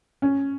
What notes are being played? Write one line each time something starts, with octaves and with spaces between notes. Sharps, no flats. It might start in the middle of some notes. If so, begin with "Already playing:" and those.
C#4